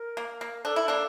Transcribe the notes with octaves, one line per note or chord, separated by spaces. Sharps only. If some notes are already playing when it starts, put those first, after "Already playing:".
Already playing: A#4
A#3
A#3
D4 A4
E4
A#3 D4